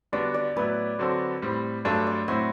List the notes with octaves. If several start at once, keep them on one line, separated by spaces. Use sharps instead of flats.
D3 G3 B3 D4 F#4 D5
D5
A2 F#3 B3 E4 B4
D3 F#3 C4 F#4 A4
A2 G3 C4
G2 F#3 A3 D4 A4 C5
D5
A2 F#3 C4 F#4 E5